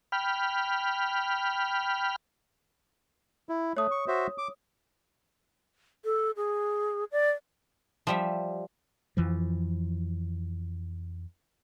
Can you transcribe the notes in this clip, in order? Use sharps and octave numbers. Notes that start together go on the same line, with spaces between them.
G5 B5 F6
E4
A3 C#5 D#6
C#6
F#4 C5 E5
D6
A4
G#4
D5
F3 G3 E5
F2 E3 F3